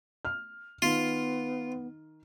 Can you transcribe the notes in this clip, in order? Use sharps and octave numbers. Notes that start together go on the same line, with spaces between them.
F6
D#3 B3 F4